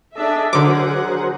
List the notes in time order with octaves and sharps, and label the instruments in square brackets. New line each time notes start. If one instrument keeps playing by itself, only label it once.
[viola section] D4 G#4 E5 [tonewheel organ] A4 D#5
[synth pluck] D3 D6 [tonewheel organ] F#3 A#4 C5 [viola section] G#4 F#5